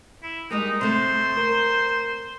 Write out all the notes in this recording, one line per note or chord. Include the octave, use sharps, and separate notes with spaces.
E4
G3 G#3 A#3 D#4
C3 A3 C5
A#4